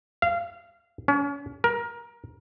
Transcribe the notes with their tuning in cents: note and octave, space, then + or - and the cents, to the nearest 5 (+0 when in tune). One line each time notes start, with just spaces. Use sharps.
F5 -25
C#4 +35
A#4 +20